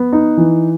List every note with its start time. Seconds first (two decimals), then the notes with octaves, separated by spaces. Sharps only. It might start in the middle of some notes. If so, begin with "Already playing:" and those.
Already playing: B3
0.13 D#4
0.37 E3